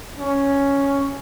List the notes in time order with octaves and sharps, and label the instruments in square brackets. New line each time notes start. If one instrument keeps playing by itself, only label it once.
[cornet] C#4